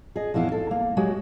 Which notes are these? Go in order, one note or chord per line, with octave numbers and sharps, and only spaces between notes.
G#4 D#5
F2 E3 B3 E4 F5
A4
A#3
F#3 G#3 F#4 G4